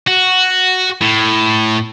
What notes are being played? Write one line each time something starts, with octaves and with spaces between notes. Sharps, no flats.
F#4
A2